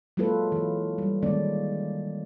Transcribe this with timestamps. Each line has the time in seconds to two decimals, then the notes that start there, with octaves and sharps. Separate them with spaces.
0.17 F#3 G#3 A#3 F4 A4 B4
0.52 E3
0.98 G3
1.23 D#3 G#3 A#3 C#4 D5